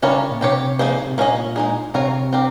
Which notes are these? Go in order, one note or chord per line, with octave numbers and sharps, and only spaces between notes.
C#3 G3 C#4 F4 A#4 C#5
A#2
C3 C4 G4 C#5
F3 A#3 D#4 G#4 C5
C3
A#2 A#3 C#4 G#4 D#5
G#3 D#4 G#4
C3 C4 F4 A#4 C#5
C4 G4 A#4